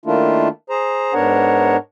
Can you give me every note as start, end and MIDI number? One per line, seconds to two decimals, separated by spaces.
0.06 0.48 51
0.06 0.48 57
0.06 0.48 58
0.06 0.48 62
0.06 0.48 64
0.06 0.48 65
0.70 1.14 68
0.70 1.14 72
0.70 1.14 82
1.14 1.77 44
1.14 1.77 59
1.14 1.77 62
1.14 1.77 70
1.14 1.77 73
1.14 1.77 78